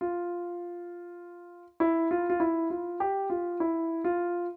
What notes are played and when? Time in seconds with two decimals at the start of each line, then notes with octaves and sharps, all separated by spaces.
0.01 F4
1.80 E4
2.11 F4
2.30 F4
2.40 E4
2.70 F4
3.00 G4
3.30 F4
3.60 E4
4.04 F4